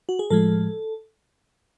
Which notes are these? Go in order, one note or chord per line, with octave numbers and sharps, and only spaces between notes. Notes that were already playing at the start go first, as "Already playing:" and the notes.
F#4
G#4
A2 F3 G#3 A4